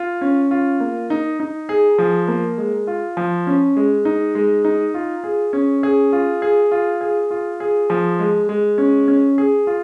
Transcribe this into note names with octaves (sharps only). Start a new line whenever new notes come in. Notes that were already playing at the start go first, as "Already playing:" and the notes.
Already playing: F4
C#4
F4
A#3
D#4
D#4
G#4
F3
A#3
G#3
F4
F3
C#4
G#3
D#4
G#3
D#4
F4
G#4
C#4
G#4
F4
G#4
F4
G#4
F4
G#4
F3
G#3
G#3
C#4
C#4
G#4
F4